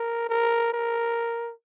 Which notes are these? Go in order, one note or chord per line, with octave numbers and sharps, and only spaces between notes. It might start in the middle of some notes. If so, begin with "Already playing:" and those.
Already playing: A#4
A#4
A#4